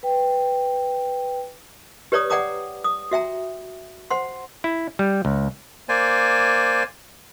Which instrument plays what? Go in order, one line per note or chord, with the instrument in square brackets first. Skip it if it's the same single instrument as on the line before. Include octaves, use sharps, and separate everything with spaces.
[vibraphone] B4 G5
[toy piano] G4 B4 C#5 D5 A#5 D#6
D5 F#5 G5 A#5 D6 D#6
D#6
F#4 E5 G5 A#5
C5 F#5 C6
[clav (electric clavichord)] E4
G3
C#2
[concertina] A#3 C5 D5 G#5